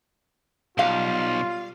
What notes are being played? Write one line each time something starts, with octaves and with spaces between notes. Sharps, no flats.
B1 G3 F4 F5